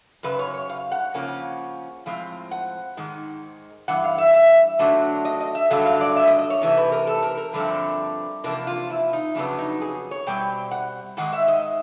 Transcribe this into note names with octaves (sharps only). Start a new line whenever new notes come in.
F#2 C#3 B4
C#5
C#5
F5
F#5
C#3 F3 A#3 C#4
A2 F3 G#3 C4 F5
F#5
G#2 D#3 G#3
G2 E3 F#5
F5
E5
E5
D3 F#3 A3 D4
D#5
D#5
E5
G2 D3 F#3 A3 F5
F5
D5
E5
D#5
D#5
C#5
C3 E3 A3
B4
A#4
A4
A#4
A#4
G2 D3 F3 A3 C4
E2 C3 F3 A#3 D4 A#4
F4
E4
D#4
F2 C#3 F#3 B3 D4
D#4
G#4
C#5
B2 G3 C4 G5
F#5
G#2 D#3 G#3 F#5
E5
D#5